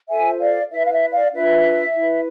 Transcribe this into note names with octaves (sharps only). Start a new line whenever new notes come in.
F4 A4 C5 E5 G#5
D5 F5
E4 B4 E5
F5
E5
D5 F5
D4 F4 B4 E5
E4 B4